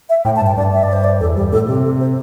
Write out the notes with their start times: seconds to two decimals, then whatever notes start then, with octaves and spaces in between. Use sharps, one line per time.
0.09 E5
0.25 A2 G5
0.36 A5
0.41 G2
0.46 G5
0.57 G2 D5
0.73 E5
0.83 D5
0.93 C5
1.04 D5
1.20 E2 A4
1.36 G2 G4
1.52 A2 A4
1.68 C3 G4
1.84 A4
2.01 C5